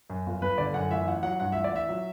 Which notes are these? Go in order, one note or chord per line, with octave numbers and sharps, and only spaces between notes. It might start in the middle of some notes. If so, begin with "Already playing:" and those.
F#2
G1
G1 B4
D3 D5
F#2 F#5
A1 E5
A1 F#5
F#3 F#5
G2 F#5
A1 E5
D5
A1 E5
F#3